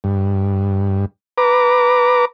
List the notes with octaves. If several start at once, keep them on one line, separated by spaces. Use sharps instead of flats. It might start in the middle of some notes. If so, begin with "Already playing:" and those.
G2
B4 A#5 D6